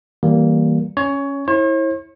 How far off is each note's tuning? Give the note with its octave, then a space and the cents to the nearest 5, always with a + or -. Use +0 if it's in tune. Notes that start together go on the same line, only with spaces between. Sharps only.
E3 -25 G3 -20 A#3 +0
C#4 +0 C#5 +20
E4 -20 C#5 -45